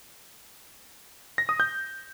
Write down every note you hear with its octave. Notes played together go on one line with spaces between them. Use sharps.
A#6
D#6
G6